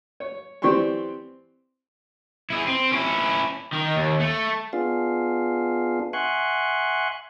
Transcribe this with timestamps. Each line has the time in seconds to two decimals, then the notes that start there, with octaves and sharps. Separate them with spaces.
0.20 C#5
0.62 E3 C4 G4 D5 C6 C#6
2.50 E4 G#4
2.66 C4
2.92 C#4 E4
3.73 D#3
3.96 D#2
4.20 A3
4.73 B3 D4 F4 G#4 F5
6.13 E5 F#5 G#5 C6 C#6 F#6